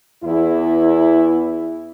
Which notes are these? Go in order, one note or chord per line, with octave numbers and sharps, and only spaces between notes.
E2 E4